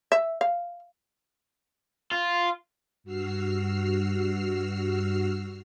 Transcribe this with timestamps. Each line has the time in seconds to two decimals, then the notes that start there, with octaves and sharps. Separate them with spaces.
0.12 E5
0.41 F5
2.12 F4
3.04 G2 F#4 E6 F6 C7